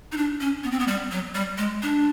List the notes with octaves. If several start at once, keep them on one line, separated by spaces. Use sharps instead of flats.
D#4
D4
C#4
B3
C4
B3
G3
F#3
G3
G#3
D4